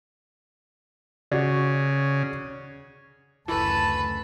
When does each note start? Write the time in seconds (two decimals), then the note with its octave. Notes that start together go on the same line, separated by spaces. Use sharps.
1.32 C#3 F#4 D5
3.48 F#1 D2 E3 A3 B4 A5